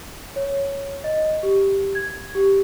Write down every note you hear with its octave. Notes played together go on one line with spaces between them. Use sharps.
C#5
D#5
G4
G#6
G4